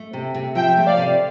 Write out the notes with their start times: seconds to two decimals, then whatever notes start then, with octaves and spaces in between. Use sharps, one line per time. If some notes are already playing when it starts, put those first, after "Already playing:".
Already playing: A3
0.13 C3
0.35 C3
0.55 F3 E5 G5
0.77 A3
0.87 D5 F5
0.98 C3